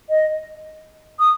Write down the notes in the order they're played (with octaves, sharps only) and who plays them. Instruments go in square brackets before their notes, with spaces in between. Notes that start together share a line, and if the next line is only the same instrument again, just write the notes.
[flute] D#5
D#6